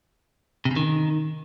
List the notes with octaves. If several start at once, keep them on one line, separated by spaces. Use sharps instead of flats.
C3
C#3
D#3